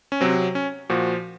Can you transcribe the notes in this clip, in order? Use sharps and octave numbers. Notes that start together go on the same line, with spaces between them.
C#4
C3 F#3 C4
C#4
A#2 F3 F#4